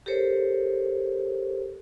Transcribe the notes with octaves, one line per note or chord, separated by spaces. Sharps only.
G4 A4 A#4 C5 C#5